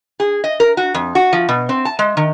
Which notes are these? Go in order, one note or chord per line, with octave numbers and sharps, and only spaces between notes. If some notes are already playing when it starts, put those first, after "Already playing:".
G#4
D#5
A#4
F#4
F2
F#4
F3
B2
C4
A5
G#3
D#3